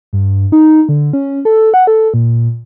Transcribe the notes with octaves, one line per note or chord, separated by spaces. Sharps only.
G2
D#4
D3
C#4
A4
F#5
A4
A#2